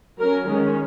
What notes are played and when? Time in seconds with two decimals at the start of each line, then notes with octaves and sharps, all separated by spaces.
0.19 F#3 C#4 A#4
0.47 D#3 G#3 C#4